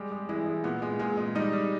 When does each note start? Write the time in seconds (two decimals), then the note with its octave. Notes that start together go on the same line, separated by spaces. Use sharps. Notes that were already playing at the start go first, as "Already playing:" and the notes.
Already playing: G3 G#3 G4
0.11 G#3
0.29 E3 G#3 E4
0.46 G#3
0.64 A#2 B3
0.82 G#3
0.99 A#2 G#3 G#4
1.17 G#3
1.35 G3 D#4 D#5
1.53 G3